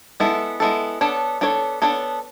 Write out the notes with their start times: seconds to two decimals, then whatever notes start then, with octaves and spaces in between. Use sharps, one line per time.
0.20 G#3 B3 E4 A4
0.60 G#3 B3 E4 A4
1.01 B3 D4 A4 C#5
1.41 B3 D4 A4 C#5
1.82 B3 D4 A4 C#5